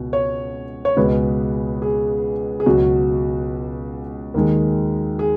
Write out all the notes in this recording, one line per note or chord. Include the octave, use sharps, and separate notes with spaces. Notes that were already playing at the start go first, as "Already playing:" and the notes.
Already playing: C#2 B2
C#5
C#5
C#2 B2 G#3 B4
G#4
G#4
C#2 B2 F#3 F#4
D#2 D#3 G#3
G#4